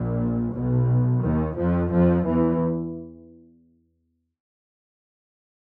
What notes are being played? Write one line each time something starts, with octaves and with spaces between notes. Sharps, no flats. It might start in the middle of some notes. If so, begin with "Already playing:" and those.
Already playing: A#1 A#2
B1 B2
D#2 D#3
F2 F3
F2 F3
E2 E3